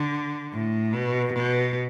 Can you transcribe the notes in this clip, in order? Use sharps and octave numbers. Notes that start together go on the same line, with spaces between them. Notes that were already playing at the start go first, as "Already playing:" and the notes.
Already playing: D3
A2
B2
B2